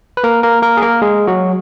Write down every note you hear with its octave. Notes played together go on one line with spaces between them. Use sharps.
B4
A#3 A#4
A#3 A#4
A#3 A#4
G#4
A#3 A#4
G#3 G#4
F#3 F#4